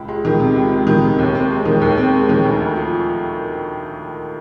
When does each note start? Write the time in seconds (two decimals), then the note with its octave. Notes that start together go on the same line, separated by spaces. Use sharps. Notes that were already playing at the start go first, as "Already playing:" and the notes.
Already playing: C#2
0.08 G#3
0.25 D#3
0.39 C3
0.55 C#2
0.72 G#3
0.87 D#3
1.04 C3
1.19 D#2
1.35 C4
1.50 G#3
1.65 D#3
1.82 D#2
1.98 C4
2.14 G#3
2.29 D#3
2.45 D2
2.60 D2
2.76 F3